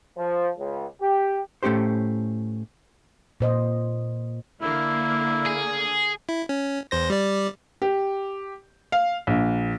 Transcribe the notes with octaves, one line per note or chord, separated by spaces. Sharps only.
F3
C#2
G4
A2 A3 C#4 G4 C5
A#2 C5 D#5
D3 A#3 E4
G#4
E4
C#4
E2 C5 A#6
G3 D5
G4
F5
A#1